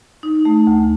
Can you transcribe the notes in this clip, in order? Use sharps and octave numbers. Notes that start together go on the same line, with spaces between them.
D#4
A3
D2